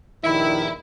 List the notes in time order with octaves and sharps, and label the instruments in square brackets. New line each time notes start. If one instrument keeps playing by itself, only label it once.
[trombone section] A#1 G2 D#3 [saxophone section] E4 [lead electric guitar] E5 B5